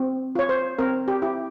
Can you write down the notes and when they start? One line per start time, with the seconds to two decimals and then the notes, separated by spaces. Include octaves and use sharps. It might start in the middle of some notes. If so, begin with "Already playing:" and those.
Already playing: C4
0.35 F4 C#5
0.49 C5
0.79 C4 A#4
1.08 G4
1.22 E4 G4